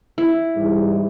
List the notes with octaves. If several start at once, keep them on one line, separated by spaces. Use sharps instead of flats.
E4
G#2 E3 G3